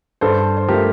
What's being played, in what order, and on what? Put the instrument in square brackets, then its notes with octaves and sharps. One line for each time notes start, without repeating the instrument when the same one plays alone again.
[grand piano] G2 A4 C5
C5
F3 A3 G4 A#4